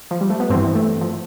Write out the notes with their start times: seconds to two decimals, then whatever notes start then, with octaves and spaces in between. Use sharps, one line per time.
0.11 F3
0.21 G3
0.30 A3
0.40 B3
0.49 G2 C4
0.55 E3
0.75 A3
1.01 F3